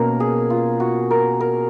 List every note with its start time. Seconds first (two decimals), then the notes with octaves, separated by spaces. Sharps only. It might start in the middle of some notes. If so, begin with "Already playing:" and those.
Already playing: B2 A#3 C#4 A#4
0.20 G#4
0.50 F4
0.80 F#4
1.11 A#4
1.40 A#4